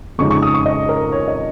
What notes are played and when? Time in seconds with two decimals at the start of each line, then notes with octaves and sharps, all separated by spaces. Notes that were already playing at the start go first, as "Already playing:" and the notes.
0.18 F2 C#3 G#3 D#4 C#6
0.31 C#6
0.42 D#6
0.54 C#6
0.66 D#5
0.89 A#4
1.12 C#5
1.28 D#5